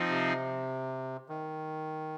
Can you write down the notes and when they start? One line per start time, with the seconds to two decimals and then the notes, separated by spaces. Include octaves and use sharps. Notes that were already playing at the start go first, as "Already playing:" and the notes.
Already playing: F3 C4 D#4
0.09 C3
1.29 D#3